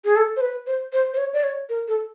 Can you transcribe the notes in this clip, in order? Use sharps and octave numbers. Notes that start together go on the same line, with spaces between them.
G#4
A4
C5
B4
C5
C5
C5
C#5
D5
C#5
A#4
A4